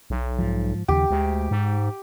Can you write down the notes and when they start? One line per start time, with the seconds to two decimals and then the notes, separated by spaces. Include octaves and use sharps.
0.10 B1
0.39 G#2 F3
0.88 D#2 C#3 F3 G4
1.11 D2 G#3
1.51 G#2